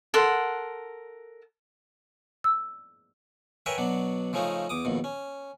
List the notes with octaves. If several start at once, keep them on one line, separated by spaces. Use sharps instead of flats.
A4 A#4 F#5 C6
E6
A#4 B4 C#5 E5 G5 G#5
B2 F#3 D4
C#3 F3 A3 C#4 D#4
E2 D6 D#6
A#1 D#2 B2
C#4